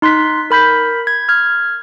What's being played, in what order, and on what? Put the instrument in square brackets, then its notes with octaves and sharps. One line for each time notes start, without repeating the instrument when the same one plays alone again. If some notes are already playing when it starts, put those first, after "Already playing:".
[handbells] D#4 C6 F#6 B6
A#4 B5 G6 B6
G#6
F6 G#6